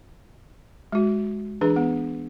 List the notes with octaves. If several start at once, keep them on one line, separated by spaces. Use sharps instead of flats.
G#3 F#4
E3 D4 G#4 B4
B3